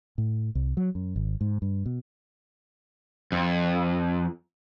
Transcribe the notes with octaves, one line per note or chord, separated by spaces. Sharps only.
A2
C2
F#3
F#2
G#1
G#2
G2
B2
F2